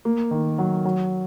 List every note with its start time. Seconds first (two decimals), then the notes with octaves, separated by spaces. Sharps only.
0.05 A#3
0.31 D#3
0.58 F#3
0.85 F#3